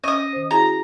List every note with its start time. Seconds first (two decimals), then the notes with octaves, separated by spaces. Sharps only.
0.04 C#4 D#5 C#6 D#6
0.33 D#3 C5
0.51 E4 F#4 G#4 A#5